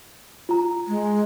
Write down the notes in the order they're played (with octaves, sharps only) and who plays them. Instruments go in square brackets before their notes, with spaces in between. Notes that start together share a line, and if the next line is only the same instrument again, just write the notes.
[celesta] F4 A#5
[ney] G#3